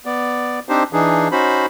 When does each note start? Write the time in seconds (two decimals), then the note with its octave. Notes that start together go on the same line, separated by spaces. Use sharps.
0.06 B3 D5
0.69 C4 D4 D#4 G4 C5
0.93 E3 D4 D#4 G#4
1.32 C#4 D#4 F#4 C5 B5